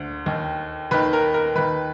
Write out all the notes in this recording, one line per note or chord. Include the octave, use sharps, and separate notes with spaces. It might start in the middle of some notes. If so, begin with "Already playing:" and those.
Already playing: D2 D3
D#2 D#3
D#2 D#3 B4
A#4
A#4
D#2 D#3 B4